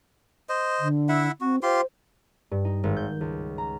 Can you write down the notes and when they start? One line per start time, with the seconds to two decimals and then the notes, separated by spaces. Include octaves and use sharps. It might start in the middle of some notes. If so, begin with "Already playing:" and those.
0.49 C5 D#5
0.80 D3
1.09 E4 E5 F#5
1.41 C4 F#4
1.63 F4 G4 C5 C6
2.51 G2
2.65 D#4
2.83 G#1
2.97 G6
3.21 C#2
3.58 A#5